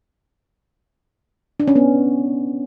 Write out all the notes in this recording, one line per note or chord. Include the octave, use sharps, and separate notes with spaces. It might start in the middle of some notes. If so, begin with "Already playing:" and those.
D4
C#4
B3